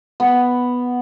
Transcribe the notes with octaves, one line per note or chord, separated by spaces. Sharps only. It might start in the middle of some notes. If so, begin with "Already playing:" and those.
B3